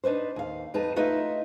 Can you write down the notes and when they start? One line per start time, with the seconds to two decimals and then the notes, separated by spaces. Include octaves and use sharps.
0.04 D4 D#4 B4 C5
0.36 D#2 F5
0.74 F2 D#4 B4 A5
0.96 A3 D#4 F4 B4 D#5 E5